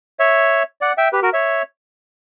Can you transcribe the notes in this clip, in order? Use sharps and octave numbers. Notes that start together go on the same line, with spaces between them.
C#5 E5
D5 F#5
E5 G5
G4 B4
F#4 A#4
C#5 E5